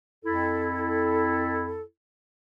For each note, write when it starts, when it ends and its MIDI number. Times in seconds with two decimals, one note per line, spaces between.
0.24 1.82 41
0.24 1.82 64
0.24 1.82 69